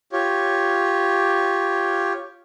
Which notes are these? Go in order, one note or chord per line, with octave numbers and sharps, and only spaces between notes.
F4 G4 C#5